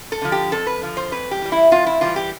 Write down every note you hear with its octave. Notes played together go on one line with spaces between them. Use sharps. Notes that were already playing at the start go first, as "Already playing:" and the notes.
A4
D3 F3
G4
F2 A4
B4
D3 F3
C5
F2 B4
G4
E3 G3
E4
F2 F4
E4
E3 G3 F4
G4